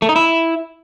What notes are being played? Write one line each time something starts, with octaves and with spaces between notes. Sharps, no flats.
A3
D#4
E4